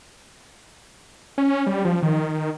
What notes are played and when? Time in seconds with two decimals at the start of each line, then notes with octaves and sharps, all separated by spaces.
1.38 C#4
1.67 G3
1.85 F3
2.03 D#3